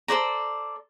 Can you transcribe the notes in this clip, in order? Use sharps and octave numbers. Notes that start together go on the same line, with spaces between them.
A4 C5 D5 A#5